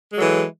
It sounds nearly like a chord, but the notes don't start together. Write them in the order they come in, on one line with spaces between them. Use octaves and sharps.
G#3 A4 F#3 E3